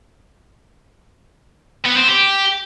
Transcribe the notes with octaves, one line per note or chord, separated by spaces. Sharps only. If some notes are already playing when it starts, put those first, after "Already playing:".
B3
C4
G4